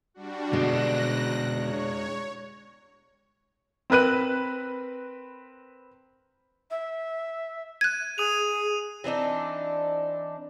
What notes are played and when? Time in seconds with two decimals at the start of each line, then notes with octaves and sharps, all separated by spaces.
0.14 G3 D4 F#4
0.53 B2 D3 G#3 C#4 D4 F#6 A#6
1.54 C#5
3.90 C4 A#4 B4 F#6 D#7
6.71 E5
7.81 F#6 G#6 D#7
8.18 G#4 D#6 D#7 F7
9.04 E3 C4 D4 D#4